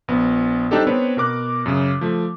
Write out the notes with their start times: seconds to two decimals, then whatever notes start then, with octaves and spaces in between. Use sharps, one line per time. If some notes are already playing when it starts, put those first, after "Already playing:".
0.08 A#1 B3
0.71 G3 C4 D4 D#4 G4 A4
0.87 B3 C4 D4 B4 C#5
1.17 B2 A#4 D6 F#6
1.66 F#2 C#3
2.01 F3 A3